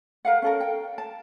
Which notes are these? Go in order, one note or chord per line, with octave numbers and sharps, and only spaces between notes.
A#4 F5 F#5
C#4 A4 A#4
G5
A5